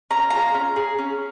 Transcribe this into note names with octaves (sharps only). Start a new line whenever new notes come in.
C#4 A#5
F4 G#4 A#5
C#4
G#4
C#4